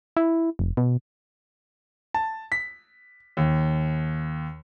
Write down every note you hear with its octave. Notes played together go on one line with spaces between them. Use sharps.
E4
F1
B2
A5
B6
D#2